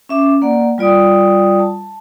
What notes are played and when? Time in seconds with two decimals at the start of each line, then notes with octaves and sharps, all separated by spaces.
0.09 C#4 E5 D6
0.42 A#3 D5 F#5
0.78 G3 F4 D5 G5 D#6
1.59 A5